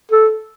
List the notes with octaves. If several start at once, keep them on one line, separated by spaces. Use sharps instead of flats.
A4